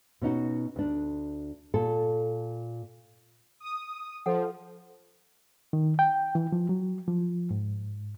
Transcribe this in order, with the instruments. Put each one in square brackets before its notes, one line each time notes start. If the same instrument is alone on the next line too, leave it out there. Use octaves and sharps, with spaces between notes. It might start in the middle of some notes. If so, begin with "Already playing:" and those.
[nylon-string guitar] B2 C#4 D#4 F#4
D2 D4
A#2 A4
[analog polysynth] D#6
[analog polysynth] F3 [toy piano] A4 F#5
[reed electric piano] D#3
G5
E3
F3
F#3
F3
G#2